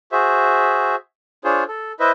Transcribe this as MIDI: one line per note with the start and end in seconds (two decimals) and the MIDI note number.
0.12 0.95 66
0.12 0.95 68
0.12 0.95 72
0.12 0.95 76
1.44 1.64 62
1.44 1.64 65
1.44 1.64 68
1.44 1.64 72
1.44 1.64 73
1.68 1.92 69
2.00 2.12 64
2.00 2.12 71
2.00 2.12 72
2.00 2.12 75
2.00 2.12 76